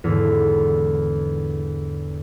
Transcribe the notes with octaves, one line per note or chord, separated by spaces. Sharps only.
E2 G#2 D3